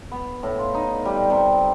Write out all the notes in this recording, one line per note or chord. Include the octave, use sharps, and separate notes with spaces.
B3
A2
F4
D#4
G3
C3